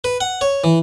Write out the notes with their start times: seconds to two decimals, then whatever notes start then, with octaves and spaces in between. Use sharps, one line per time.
0.04 B4
0.21 F#5
0.41 C#5
0.64 E3